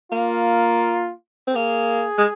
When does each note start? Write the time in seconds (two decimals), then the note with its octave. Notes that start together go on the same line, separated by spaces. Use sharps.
0.12 A#3 F4
1.47 C4
1.54 A#3 G#4
2.18 G#3